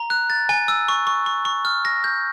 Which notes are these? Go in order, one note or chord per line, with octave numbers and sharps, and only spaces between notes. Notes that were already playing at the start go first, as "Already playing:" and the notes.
Already playing: A#5
F#6
A6
G#5
E6
C#6
C#6
C#6
C#6
F6
A#6
G6